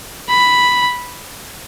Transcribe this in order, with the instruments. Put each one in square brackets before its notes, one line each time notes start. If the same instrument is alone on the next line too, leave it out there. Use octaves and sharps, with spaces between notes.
[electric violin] B5